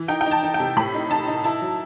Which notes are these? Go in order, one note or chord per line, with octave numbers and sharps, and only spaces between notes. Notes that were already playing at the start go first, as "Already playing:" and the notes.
Already playing: E3
D#4 G5
G5
D#4
A5
D#4
G5
C3
A2 B5
D#4
D#4 A5
D#4
E4 A5
F#3